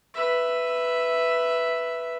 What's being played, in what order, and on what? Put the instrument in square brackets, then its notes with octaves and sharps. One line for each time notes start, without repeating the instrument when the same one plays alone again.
[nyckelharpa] B4 E5